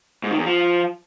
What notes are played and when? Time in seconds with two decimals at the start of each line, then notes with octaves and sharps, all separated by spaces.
0.24 G#2
0.31 D#3
0.38 E2
0.46 F3